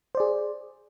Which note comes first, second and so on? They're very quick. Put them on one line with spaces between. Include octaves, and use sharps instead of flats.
C5 D5 G#4